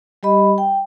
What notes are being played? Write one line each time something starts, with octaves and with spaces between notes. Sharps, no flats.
G3 G4 D#5 B5
G5